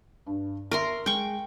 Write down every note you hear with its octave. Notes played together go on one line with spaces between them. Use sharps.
G2
A#4 E5 A#5 C6 C#6
G#3 G5 C#6